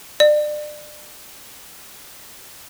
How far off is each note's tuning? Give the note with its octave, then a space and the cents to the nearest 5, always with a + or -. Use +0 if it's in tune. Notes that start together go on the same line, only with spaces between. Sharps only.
D5 +30